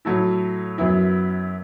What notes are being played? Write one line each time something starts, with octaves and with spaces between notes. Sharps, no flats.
A2 F#3 A3 E4
F#2 F#3 B3 E4